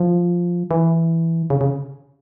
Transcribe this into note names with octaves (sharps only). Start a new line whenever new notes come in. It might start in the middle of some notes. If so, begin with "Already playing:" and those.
Already playing: F3
E3
C#3
C#3